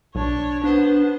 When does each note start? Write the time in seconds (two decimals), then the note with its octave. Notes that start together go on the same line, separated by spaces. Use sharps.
0.15 B1 D4 C#5
0.64 B3 D4 C5